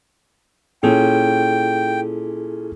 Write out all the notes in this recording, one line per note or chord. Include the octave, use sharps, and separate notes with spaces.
A#2 C#4 E4 G#4 A4 G5